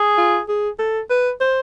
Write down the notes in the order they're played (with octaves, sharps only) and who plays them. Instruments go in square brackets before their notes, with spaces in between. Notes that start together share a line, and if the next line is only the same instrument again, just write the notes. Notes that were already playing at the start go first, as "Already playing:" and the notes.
Already playing: [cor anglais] G#4
[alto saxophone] F4
G#4
A4
B4
C5